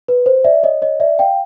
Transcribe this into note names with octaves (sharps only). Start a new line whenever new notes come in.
B4
C5
D5 E5
C#5 D#5
C#5 D#5
D5 E5
F5 G5